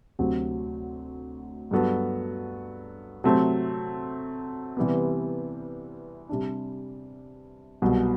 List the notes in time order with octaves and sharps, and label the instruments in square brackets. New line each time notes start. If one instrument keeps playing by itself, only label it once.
[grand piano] D2 C3 F#3 C4
G2 F#3 B3 F#4 A4
C3 F#3 A3 C4
C3 E3 G3 B3
C3 G3 D4
C2 B2 F#3